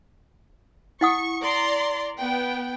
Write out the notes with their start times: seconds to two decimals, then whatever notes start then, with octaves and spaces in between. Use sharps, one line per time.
1.01 E4 F#5 C#6 D#6
1.42 D5 A#5 C6
2.16 B3 G5